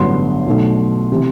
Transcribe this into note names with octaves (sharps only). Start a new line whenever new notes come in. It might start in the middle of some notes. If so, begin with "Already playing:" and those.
Already playing: A1 G2 D3 F#3 B3 C6
B1 B2 A3
C3 E3